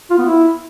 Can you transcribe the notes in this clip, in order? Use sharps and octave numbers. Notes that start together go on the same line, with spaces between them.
F4
B3
E4